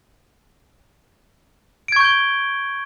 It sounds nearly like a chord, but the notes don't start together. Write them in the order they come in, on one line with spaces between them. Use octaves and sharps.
D7 G#6 C#6 G6 G7